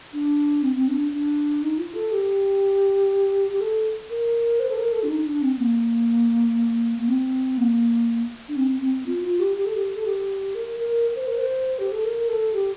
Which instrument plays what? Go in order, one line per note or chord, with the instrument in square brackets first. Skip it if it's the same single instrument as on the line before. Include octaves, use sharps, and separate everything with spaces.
[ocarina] D4
C4
C4
D4
D4
D#4
F4
A4
G4
G4
A4
A#4
C5
A4
A#4
A4
D4
D#4
D4
C4
A#3
A#3
C4
A#3
D4
C4
C4
F4
F4
G4
G4
A4
G4
A4
G4
A#4
A#4
C5
A#4
C5
G4
A4
A#4
A4
G4